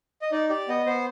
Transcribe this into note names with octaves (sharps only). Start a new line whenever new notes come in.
D#5
D#4 D5
G4 D5
B3 D#5
B3 C5